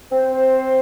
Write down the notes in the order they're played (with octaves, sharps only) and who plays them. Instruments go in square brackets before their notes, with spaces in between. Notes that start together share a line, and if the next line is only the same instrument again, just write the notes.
[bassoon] C4 [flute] C5
[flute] C5